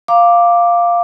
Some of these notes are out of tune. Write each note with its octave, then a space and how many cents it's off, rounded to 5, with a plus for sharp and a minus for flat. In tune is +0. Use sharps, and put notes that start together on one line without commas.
F5 +0 A#5 +0 D6 +0